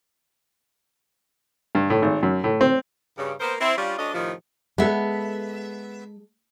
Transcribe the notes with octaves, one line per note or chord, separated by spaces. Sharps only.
G2
A2
G#1
F#2
A2
C4
G2 C#3
A#3 B3 A#4 C5
C4 E4
G3 C#4 D4 F4
D2 C#4 D4 D#5
A2 C3 D#3 F3
G#3 B3 A4 E5